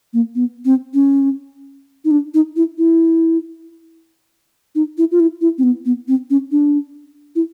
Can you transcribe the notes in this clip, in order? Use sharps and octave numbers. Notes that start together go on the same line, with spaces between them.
A#3
B3
C4
C#4
D#4
D4
D#4
E4
E4
D#4
E4
F4
E4
E4
C4
B3
B3
C4
C#4
D4
E4